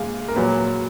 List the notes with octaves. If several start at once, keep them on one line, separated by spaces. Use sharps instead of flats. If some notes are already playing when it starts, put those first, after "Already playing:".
Already playing: A#2 G#3 F5 G#5
A#4
A#2 F#3 B4